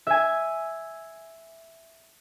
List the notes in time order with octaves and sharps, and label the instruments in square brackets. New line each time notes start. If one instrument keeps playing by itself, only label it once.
[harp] E5 G#5